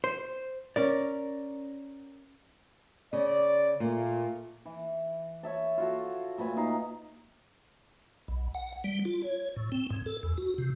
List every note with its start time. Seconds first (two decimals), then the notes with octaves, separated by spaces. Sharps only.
0.04 C5
0.76 C#4 A#4 D5
3.13 C#3 D5
3.80 A#2 A3 A#3 F4
4.66 E3
5.43 C#5 E5 A5
5.78 F4 F#4 A4
6.38 A#2 A3 B4 G#5
6.57 D#4 F5 A#5
8.28 B1
8.54 F#5
8.84 G3
9.05 F4
9.22 C#5
9.56 A2
9.72 C4
9.90 G#2
10.06 A4
10.23 E2
10.38 F#4
10.58 C3